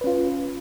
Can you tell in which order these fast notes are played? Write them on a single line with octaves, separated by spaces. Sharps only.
B4 C#4 F4